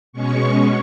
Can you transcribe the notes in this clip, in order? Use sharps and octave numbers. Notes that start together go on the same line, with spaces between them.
B2 G#3 C#4 C#6